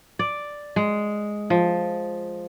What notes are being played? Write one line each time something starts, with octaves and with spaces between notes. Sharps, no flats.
D5
G#3
F3